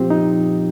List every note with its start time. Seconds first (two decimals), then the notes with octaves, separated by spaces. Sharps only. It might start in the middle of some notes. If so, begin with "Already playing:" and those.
Already playing: A#2 F3 C4 F4 G4
0.10 D#4